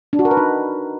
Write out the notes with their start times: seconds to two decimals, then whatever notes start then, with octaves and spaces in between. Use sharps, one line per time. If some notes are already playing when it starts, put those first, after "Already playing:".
0.13 D4
0.19 F#4
0.25 A#4
0.31 B4
0.37 D#4